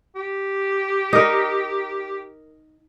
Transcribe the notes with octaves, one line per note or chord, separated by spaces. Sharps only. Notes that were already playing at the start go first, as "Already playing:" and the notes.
G4
D#4 A#4